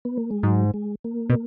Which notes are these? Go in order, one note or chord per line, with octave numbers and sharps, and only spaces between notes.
B3
A#3
G#3
G#2 F#3
G#3
A#3
B2